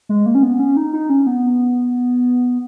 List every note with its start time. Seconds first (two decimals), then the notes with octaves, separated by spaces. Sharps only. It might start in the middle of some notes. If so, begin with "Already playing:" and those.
0.09 G#3
0.26 A#3
0.35 C#4
0.43 B3
0.60 C#4
0.77 D#4
0.93 D#4
1.10 C#4
1.27 B3